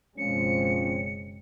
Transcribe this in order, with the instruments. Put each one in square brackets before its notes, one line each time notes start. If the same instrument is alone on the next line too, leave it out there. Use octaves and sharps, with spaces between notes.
[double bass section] F#1 B2 G#3 [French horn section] F3 C4 C#4 [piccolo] C#7